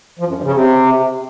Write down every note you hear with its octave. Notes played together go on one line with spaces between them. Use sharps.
F3
F#2
G2
C#3
C3